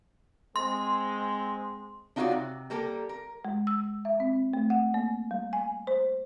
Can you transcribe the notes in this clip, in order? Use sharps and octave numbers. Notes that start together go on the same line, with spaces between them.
G#3 C4 C6
D4 D#4 F4 F#4 C#5 D5
C3
G3 A#3 A4 A#4
A#4
G#3
E6
E5
C4
A3
F#5
A#3
G3
G#5
C5